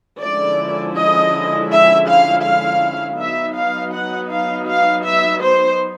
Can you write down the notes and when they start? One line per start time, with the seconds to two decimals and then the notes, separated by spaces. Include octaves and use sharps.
0.21 D3 F3 G#3 C#4 E4 D5
0.96 D#5
1.71 E5
2.08 F5
2.45 F5
3.20 F#3 B3 D#4 E5
3.57 F5
3.95 F#5
4.32 F5
4.69 F5
5.06 E5
5.44 C5